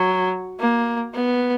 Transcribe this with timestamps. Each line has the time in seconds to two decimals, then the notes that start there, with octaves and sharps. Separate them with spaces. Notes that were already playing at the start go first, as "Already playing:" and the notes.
Already playing: F#3
0.60 A#3
1.14 B3